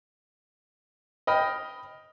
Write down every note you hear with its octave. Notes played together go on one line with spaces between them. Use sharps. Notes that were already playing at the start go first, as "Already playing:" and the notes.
D#5 G5 B5 F6